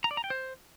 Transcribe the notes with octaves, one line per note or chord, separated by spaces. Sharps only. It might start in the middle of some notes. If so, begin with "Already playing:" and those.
A#5
D5
A#5
G5
C5